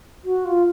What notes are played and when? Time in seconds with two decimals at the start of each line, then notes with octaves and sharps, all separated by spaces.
0.24 F#4
0.45 F4